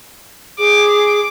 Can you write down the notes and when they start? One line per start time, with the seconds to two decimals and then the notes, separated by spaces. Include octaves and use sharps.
0.59 G#4 D6